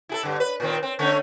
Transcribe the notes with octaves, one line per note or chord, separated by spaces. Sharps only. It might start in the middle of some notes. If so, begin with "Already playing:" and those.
E4 G#4 A4
G2 D3
B4
A#2 D#3 C4
C4
D3 A3 C#4